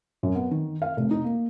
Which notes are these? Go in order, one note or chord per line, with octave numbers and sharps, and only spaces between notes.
F#2
B3
D#3
F5
F1
D#4
A#3